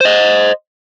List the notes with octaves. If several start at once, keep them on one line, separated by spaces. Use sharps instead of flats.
C5 D#5